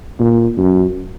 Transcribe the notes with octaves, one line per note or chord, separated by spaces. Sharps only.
A#2
F#2